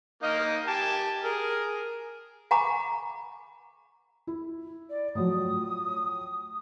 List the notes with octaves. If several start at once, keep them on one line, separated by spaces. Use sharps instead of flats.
A#3 D#4 D#5 F5
G4 G#5 A5
G#4 A#4
F#5 G#5 A#5 B5 C#6 D6
E4
D5
A2 F3 F#3 D#6